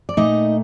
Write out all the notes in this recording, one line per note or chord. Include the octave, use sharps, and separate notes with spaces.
D5
A#2 A3 D#4 D#5